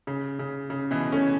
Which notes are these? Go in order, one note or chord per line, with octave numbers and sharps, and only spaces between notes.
C#3
C#3
C#3
B2 E3
A3 C#4